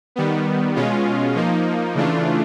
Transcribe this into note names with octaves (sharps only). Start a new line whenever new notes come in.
D#3 G3 B3
B2 G#3 C#4 F4
F3 A#3 D#4
C#3 E3 A3 D4 F4